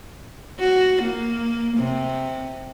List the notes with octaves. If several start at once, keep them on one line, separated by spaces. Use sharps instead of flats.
F#4
A#3
C3